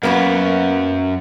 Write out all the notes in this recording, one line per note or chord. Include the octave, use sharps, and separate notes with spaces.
F#2 A#3 B3 F#4